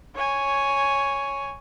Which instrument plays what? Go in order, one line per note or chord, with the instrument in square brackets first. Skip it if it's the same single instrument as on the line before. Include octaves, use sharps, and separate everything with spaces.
[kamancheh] C#5 G#5